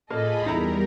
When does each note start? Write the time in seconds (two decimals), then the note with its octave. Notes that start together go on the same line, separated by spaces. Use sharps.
0.10 A2 A#3 F4 G#4 A4 D#5 B5
0.46 E2 G3 D#4 E4 A#4 A#5